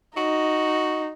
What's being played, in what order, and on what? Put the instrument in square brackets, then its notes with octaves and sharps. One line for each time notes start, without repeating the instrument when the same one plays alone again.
[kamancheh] D#4 [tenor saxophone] F#4